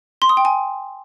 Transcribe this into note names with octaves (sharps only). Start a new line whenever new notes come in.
C6
D#6
G5
G#5